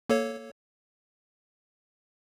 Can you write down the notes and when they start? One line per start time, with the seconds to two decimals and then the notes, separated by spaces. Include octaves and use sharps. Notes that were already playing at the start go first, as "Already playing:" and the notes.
0.09 A#3 A4 C#5